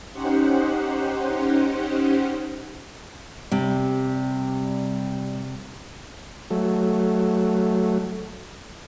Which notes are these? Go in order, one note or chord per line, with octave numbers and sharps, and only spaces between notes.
C#4 D#4 G4 C5 F#5
C3 G3
F#3 A3